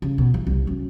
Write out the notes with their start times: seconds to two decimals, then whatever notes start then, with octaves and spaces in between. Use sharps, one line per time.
0.02 C#3
0.18 B2
0.34 E3
0.47 C2
0.67 F#2